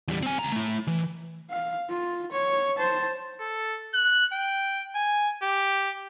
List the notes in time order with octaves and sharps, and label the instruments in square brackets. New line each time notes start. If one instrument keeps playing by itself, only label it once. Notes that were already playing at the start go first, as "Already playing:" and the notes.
[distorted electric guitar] E2 G3
C4 G#5
C#2 A#5
A3 E4
E3
[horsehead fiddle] F5
F4
C#5
C5 A5
[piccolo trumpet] A4
F#6
G5
G#5
G4